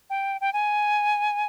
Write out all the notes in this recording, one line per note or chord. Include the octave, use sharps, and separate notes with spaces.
G5
G5
G#5